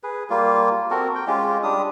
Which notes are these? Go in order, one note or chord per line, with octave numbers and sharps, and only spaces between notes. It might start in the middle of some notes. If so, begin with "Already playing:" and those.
G#4 B4
G3 A#3 F4
C4 F#4 A4 A#4
G5
G#3 C#4 F4 G4
G3 D4 G4 D#6